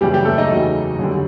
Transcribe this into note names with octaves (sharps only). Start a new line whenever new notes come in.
F#2 C#3 E3 G3 G4
G3 G4
A3 A4
D#4 D#5
E2 C#3 F#3
F#2 D3 G3